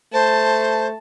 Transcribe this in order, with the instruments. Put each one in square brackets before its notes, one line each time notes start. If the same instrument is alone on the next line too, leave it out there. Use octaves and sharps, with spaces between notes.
[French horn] A3 [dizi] C5 [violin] A5